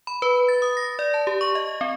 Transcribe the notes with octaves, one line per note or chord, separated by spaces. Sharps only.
B5
B4
A6
D#6
A#6
D5
A5
G4
C#6
D#5
C4